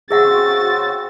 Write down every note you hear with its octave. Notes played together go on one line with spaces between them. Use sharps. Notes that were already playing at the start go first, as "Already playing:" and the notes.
C#3 C4 F#4 G#4 E5 F#5 E6 A6